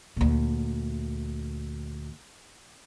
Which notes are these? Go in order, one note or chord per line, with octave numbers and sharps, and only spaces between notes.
D2 A#2